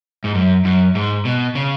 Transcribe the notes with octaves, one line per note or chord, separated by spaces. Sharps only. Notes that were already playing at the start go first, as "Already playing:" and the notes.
G#2
F#2
F#2
G#2
B2
C#3